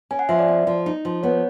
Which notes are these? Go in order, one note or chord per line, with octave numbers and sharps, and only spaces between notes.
C#4 G#5
F#5
F3 E5
D5
C4
F3
D#4
F3
B3 C#5